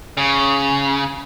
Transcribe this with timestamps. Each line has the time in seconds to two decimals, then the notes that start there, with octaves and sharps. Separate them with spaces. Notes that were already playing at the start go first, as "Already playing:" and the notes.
0.17 C#3